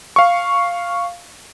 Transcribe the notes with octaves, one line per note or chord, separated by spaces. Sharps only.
F5 C#6